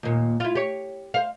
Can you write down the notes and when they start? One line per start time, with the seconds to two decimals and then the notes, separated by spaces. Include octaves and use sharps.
0.03 D#2 A#2
0.40 E4 F4
0.55 G4 C#5
1.14 C5 F5